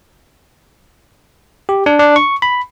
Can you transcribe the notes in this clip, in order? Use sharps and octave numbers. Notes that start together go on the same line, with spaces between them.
G4
D4
D4
C#6
B5